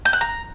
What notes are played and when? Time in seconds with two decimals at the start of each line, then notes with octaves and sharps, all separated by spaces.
0.05 G6
0.13 F#6
0.21 A#5